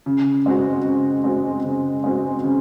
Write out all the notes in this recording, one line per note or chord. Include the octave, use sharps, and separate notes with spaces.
C#3
G#3 C4 F#4
C#3
G#3 C4 F#4
C#3
G#3 C4 F#4
C#3